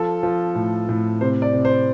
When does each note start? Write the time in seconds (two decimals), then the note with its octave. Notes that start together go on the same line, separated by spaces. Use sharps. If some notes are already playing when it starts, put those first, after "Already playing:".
Already playing: F3 A4
0.23 F3
0.55 A2
0.89 A2
1.21 C3 C5
1.42 D5
1.53 C3
1.65 C5